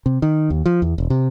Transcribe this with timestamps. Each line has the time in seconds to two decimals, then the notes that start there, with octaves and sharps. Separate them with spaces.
0.06 C3
0.22 D#3
0.50 D#2
0.66 F3
0.82 E2
0.98 E1
1.10 C3